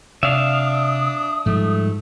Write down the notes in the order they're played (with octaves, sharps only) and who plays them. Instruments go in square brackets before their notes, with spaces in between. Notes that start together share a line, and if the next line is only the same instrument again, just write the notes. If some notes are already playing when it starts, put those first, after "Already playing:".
[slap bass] C3 [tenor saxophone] D4 [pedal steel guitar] E5 F5 [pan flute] D#6
[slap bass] G#2 F3 G3 [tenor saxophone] A3